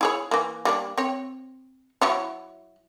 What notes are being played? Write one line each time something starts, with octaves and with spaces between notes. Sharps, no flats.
E4 G#4 C#5
E3 A#3
G3 A#3 D4
C4 C#5
F#3 E4 C#5